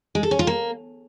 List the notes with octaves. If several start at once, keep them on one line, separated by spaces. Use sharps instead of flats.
G#3
A4
C#4
F4
A#3